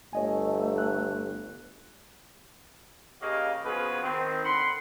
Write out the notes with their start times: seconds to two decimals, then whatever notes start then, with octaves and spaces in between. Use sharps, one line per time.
0.13 G1 A3 C#5 D#5 G#5
0.78 F#6
3.21 C#3 A#3 G4 C#5 D#5 F5
3.65 C#3 F3 B3 F#4 G#4 B4
4.03 D#3 C4
4.44 D3 F#5 B5 C6